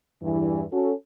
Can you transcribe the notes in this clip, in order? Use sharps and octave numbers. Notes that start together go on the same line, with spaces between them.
E2 G2 E3
C#4 F#4 A4